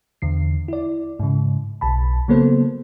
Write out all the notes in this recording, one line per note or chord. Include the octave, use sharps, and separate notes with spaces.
E2 D3 C7
E4 D5
G#2 C#3
B1 A5 B5
C#3 F#3 A#3 B3 A4 C5